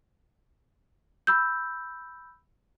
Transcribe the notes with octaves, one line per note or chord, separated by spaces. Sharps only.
B5 E6 G6